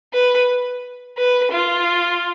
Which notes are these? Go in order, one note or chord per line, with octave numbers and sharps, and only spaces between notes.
B4
B4
F4